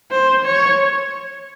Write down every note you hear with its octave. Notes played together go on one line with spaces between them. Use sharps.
C5
C#5